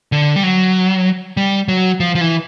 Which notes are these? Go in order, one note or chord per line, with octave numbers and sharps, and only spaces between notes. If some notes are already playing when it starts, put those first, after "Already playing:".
D3
G3
F#3
G3
F#3
F3
F3
E3